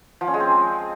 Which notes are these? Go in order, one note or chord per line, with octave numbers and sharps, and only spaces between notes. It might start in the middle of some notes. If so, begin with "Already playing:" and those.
F3
C#4
G#3
C4